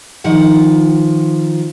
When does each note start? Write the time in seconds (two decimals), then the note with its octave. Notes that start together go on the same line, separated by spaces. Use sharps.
0.24 D#3 F3 F4 F#5